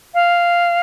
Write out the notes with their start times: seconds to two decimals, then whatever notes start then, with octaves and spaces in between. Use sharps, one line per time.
0.14 F5